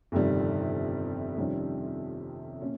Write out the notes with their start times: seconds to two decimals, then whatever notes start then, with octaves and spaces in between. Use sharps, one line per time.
0.12 G1 F2 C3 D#3 G3
1.37 F2 C3 D#3 G3 C#4
2.61 A#2 C#4